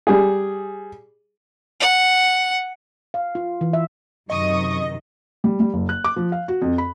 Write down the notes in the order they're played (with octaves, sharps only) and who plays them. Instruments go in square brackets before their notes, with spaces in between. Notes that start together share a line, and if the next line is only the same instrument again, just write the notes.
[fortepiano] G3 G#4
[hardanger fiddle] F#5
[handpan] F5
F4
E3
E5
[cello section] F#2 C3 D#3 [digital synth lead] D#5 [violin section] C#6 D#6
[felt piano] G3
G3
F#1
F#6
D6
F3
F5
F#4
F2
B5